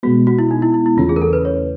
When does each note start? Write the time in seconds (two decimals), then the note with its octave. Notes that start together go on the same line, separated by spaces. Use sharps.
0.03 B2 G#3 B3 F#4
0.27 F#4
0.39 E4
0.51 D#4
0.62 E4
0.74 E4
0.86 E4
0.97 E2 C#3 E3 A3 C#4 F4
1.09 G#4
1.16 A#4
1.22 A4
1.33 B4
1.45 C#5